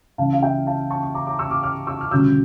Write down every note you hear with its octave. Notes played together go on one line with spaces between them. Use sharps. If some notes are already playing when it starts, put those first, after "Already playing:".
C#2 C#3 E3 F5 A5
F5
E5 G5
F5 A5
A5 C#6
C#6
A#5 D6
A#5 D6
C#6 E6
D6 F6
D6 F6
C#6 E6
F6
E1 D2 C#3 G3 C#4 E6 G6